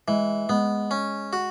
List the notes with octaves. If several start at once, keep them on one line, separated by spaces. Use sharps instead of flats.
E3 G#3
G#3 B3
C#4
F#4